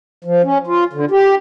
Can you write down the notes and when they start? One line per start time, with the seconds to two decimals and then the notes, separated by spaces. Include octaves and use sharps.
0.25 F3
0.43 C#4
0.67 F4
0.93 D3
1.11 G4